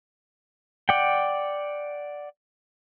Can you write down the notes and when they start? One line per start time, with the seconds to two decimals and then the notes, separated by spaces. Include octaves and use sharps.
0.89 D5 F#5 G5